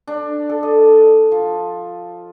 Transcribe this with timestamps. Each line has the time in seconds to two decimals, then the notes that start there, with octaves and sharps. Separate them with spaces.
0.07 D4
0.49 A4
0.63 D#5
1.32 F3